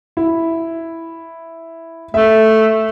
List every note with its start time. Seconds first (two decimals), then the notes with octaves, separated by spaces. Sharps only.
0.17 E4
2.14 A3 E5